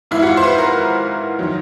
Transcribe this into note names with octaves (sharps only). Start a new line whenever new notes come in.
G#1 G#2 E3 E4
F#4
F4
C5
B4
A#4
D#3 F#3